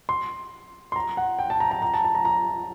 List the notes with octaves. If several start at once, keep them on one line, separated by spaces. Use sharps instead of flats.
C6
C6
A#5
F#5
G5
A5
A#5
A#5
A#5
A5
A5
A#5
A#5